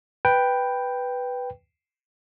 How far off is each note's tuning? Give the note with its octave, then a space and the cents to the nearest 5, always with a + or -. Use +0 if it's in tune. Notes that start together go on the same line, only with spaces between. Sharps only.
B4 +0 G5 +0